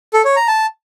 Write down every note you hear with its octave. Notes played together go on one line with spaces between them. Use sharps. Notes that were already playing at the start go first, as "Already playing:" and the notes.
A4
C#5
A#5
A5